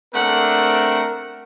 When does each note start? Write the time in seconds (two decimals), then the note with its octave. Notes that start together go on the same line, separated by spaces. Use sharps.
0.14 A3 C4 D4 A#4 F#5